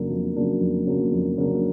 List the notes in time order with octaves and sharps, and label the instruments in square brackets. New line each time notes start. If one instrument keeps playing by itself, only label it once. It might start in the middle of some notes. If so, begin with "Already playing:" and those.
Already playing: [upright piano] F2 C#3 F#3 A#3 D4
F2
C#3 F#3 A#3 D4
F2
C#3 F#3 A#3 D4
F2
C#3 F#3 A#3 D4